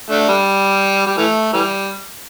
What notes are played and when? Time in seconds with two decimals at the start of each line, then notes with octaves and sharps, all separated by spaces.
0.11 A3 D4
0.29 G3
1.07 G3
1.18 E3 A3
1.53 E3 G3